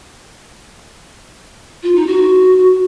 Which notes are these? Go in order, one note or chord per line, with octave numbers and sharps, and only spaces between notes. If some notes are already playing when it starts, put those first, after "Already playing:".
F4
D#4
F#4